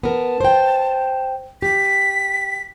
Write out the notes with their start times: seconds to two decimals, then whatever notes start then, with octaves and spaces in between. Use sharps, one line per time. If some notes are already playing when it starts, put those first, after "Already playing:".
0.03 B3 A#4 A5
0.40 C5 G5
1.62 G4 B6